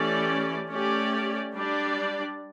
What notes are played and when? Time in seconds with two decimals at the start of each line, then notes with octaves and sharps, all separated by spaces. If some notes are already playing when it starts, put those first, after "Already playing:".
Already playing: E3 A3 C#4 G4 D5
0.70 A3 C#4 G4 D5
1.54 G3 D4 G4 D5